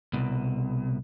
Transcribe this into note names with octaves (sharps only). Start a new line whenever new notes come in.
C2 B2